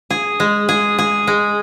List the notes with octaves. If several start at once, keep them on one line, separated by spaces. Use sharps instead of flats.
G#4
G#3
G#4
G#4
G#3